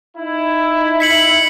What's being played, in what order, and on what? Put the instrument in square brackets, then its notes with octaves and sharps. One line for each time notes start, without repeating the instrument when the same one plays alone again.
[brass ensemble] D#4 E4
[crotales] B6 C#7 F#7